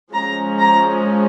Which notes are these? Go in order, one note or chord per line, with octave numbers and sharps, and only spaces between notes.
F3 G#3 C#4 A#5
A#5